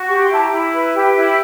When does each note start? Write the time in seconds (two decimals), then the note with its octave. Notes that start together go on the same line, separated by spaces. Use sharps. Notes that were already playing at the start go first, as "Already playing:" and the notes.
Already playing: F#4
0.08 G4 C#6
0.24 C6
0.29 E4 A5
0.41 A#5
0.51 E4
0.56 B5
0.72 B4
0.94 G4
1.15 E4